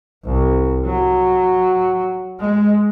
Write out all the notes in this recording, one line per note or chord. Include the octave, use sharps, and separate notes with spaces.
C2
F#3
G#3